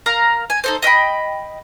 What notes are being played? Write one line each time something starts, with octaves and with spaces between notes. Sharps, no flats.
A#4 F5 A#5
G#5
D#4 A4 C5
D#5 E5 G5 B5